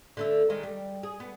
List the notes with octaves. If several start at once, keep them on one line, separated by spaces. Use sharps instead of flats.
D3 A3 E4
D#3 G#3
G3
G#4
B3